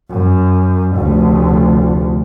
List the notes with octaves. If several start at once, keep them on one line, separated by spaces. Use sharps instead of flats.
F#2
F1 D2